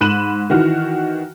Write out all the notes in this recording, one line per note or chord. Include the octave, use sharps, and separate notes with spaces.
G#2 B5 F#6 D#7 E7 F#7
D#3 E3 F#4 F6